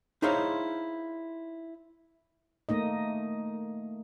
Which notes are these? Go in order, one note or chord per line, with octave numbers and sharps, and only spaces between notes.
D#4 E4 G#4 C5 C#5 F5
A3 A#3 D#4 D#5